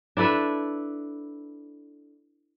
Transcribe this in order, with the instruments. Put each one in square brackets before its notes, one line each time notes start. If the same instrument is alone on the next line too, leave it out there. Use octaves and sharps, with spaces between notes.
[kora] D4 E4 A4 B4